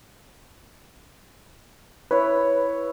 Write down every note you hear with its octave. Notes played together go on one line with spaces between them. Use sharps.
E4 B4 C#5